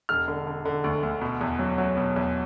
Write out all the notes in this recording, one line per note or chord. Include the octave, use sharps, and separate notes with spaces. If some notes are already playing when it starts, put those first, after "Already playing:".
E1 F6
D3
D3
D3
D2
D2
B2
E2
F#3
F#3
B2
E2